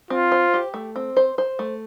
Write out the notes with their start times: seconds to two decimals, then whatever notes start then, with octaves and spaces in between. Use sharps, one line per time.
0.10 C4 F4
0.32 C5
0.54 G4
0.74 A3
0.96 C4
1.17 C5
1.38 C5
1.59 A3